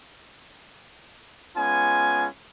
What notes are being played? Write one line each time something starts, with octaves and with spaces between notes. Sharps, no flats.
G#3 B3 C#4 F4 G#5